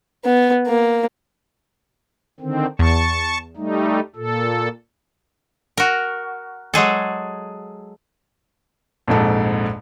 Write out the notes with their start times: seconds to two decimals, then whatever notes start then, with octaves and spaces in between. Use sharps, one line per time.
0.25 B3
0.67 A#3
2.40 D3 D#3 C4
2.79 E2 A5 C#6
3.57 G3 A3 D#4
4.16 A#2 A4
5.77 F#4 A#4
6.74 F#3 G#3 G#4 A4
9.07 A#1 F2 G#2 A4